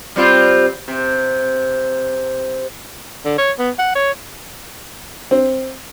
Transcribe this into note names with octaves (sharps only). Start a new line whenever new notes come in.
G3 C4 F4
C3
D3
C#5
B3
F#5
C#5
C4